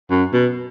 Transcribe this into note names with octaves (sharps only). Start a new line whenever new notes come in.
F#2
B2